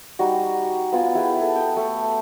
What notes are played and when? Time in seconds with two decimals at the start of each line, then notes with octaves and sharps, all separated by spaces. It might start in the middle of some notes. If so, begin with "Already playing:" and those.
0.19 G3 D#4 F#4
0.93 B3 F4 G#5
1.15 E4 G4 G#4 B4
1.41 A4
1.55 G5 D#6
1.77 A3